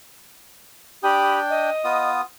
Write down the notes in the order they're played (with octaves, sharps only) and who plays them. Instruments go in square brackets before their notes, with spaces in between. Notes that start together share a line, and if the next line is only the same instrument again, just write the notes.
[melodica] D4 G5 [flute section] G4 B5 D#6
[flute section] D#5
[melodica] B3 F4 D#6